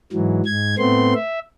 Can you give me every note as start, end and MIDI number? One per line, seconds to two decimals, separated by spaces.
0.13 0.41 44
0.13 0.41 52
0.13 0.41 54
0.45 0.75 44
0.45 0.75 92
0.78 1.14 45
0.78 1.14 57
0.78 1.14 59
0.78 1.14 60
0.78 1.14 84
1.14 1.39 76